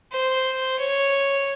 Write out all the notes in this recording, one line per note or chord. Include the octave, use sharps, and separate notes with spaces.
C5
C#5